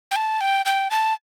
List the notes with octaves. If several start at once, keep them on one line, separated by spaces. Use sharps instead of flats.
G5
A5
G5
G5
A5